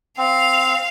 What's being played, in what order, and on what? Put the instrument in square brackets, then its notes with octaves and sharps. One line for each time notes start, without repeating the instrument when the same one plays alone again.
[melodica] C4 [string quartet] F5